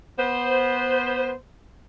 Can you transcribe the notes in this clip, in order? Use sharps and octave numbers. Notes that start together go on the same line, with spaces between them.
B3 C5